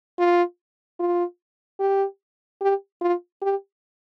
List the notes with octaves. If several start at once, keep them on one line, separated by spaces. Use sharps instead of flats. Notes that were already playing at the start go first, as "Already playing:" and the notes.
F4
F4
G4
G4
F4
G4